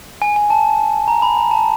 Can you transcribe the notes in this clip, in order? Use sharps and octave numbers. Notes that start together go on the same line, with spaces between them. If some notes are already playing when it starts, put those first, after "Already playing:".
G#5
G#5
A5
A#5
B5
A#5
A5